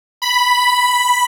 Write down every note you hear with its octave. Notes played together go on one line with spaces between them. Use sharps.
B5